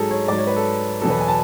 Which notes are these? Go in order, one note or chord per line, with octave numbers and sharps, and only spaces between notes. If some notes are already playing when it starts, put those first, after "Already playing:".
Already playing: G#2 F#3 G#4 A4
C#5
G#2 F#3 D5
C#5
B4
A4
E2 B2 F#3 A4
B4
G#5
A5